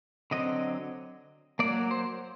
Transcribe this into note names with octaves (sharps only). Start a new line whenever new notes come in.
D3 F#3 C4 D#5
F#3 A#3 D5
C5